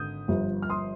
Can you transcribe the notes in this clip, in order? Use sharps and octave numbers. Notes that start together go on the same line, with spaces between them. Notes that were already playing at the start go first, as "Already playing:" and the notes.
Already playing: G#1 D3 D#6 G6
G1 G2 F3
F6
C6 D#6